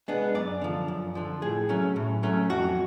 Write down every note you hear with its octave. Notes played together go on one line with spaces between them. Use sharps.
G#3 B3 D4
F#2 D5
D3 F3
F#2
D3 F3
A2 G#4
F#3 A3 C#4
A2
F#3 A3 C#4
F2 F#4